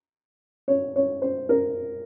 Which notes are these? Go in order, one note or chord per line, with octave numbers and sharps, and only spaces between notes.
C#5
C#5
C5
A#4